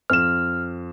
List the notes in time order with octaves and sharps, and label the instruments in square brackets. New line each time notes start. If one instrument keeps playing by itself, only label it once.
[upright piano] F2 E7 [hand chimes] F6